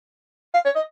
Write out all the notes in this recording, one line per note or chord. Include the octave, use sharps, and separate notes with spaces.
F5
C#5
D#5